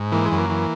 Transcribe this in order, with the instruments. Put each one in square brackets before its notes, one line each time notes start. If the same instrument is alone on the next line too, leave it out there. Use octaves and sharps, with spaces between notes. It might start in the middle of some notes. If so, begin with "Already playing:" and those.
Already playing: [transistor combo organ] G#2
E3 A#3
G#3
F#2
A#3
E3